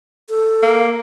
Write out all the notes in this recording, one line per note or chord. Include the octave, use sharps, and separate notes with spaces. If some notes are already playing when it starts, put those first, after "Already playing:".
A4
A#3